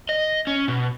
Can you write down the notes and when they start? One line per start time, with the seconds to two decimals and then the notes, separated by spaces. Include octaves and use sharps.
0.09 D#5
0.47 C#4
0.68 B2